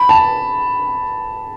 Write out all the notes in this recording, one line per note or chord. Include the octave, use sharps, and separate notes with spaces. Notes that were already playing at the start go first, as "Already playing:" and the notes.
Already playing: B5
A5